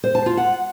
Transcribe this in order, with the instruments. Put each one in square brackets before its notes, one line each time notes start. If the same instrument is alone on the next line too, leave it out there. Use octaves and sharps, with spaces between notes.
[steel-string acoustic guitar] C5
A5
F4
F#5